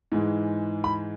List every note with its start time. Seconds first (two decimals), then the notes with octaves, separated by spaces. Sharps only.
0.12 G#2 E3 G#3
0.84 B5